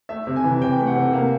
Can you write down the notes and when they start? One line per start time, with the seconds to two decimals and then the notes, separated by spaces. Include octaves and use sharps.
0.09 A3 E5
0.27 C3
0.36 G#5
0.44 E3
0.61 C3 G5
0.79 A3
0.87 F#5
0.95 C3
1.13 A#3 F5